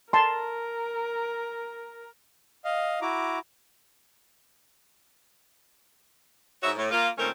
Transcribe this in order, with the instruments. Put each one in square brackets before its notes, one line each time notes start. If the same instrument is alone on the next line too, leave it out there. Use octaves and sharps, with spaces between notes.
[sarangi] A#4 [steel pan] A5 C6
[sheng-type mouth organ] D#5 F5
E4 F#4 A#5 D6
[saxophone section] G#2 F#4 C#5 E5
A2
A#3 F4
A#2 D#3 A3 C4 C#4 A#4